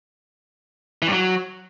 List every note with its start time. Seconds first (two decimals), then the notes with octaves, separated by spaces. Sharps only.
1.02 E3
1.07 G2
1.12 F#3